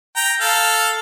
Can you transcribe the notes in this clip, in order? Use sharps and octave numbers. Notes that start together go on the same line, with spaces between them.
G5 A#5
A4 F5